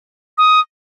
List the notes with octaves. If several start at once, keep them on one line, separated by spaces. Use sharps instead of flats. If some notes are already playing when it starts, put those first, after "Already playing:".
D#6